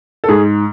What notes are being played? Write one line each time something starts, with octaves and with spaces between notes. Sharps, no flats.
A4
G#2 G#4